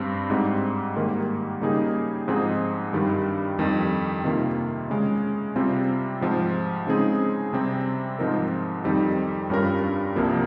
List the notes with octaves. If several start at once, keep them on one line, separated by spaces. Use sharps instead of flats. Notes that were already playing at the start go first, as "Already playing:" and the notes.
Already playing: G2 G3 C4 G4
G#2 G3 C4
G#2 D#3 G3 A#3
C#3 G3 A#3 D#4 G#4
G#2 F3 C4 D#4 G#4
G2 D#3 G3
F2 D#3 G3
C3 D#3 A#3 F4
C#3 G#3 C#4
C3 G3 C4 F4
G#2 F3 C4
C#3 G#3 C4 D#4 G#4
C3 G3 C4
G#2 F3 C4 D#4 A#4
F2 D#3 G3 C4 D#4
G2 G3 C#4 F4 A#4
C2 C3 F3 A#3